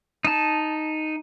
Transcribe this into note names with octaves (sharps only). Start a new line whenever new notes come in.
D#4 A5